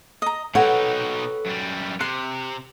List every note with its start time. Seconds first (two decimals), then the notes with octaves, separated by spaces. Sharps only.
0.22 D#5 A#5
0.55 B2 D#4 A4 B4 C#5 F#5 G5
1.46 F#2 G3
2.01 C3 C6 F#6